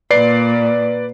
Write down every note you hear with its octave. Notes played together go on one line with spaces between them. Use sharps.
A#2 B4 D5 C7